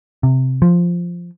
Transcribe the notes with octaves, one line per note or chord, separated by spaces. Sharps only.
C3
F3